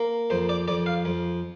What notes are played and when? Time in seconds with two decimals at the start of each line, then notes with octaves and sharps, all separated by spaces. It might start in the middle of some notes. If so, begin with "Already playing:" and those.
Already playing: A#3
0.30 F2 C5
0.49 D5
0.68 F2 D5
0.86 F5
1.05 F2